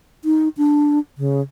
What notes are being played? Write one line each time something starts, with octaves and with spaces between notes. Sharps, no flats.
D#4
D4
C#3